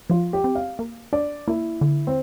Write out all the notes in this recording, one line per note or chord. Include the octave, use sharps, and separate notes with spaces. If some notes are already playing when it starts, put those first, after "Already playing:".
F3 F4
G4
C4
F5
A#3
D4 D5
A#3 E4
D3
C4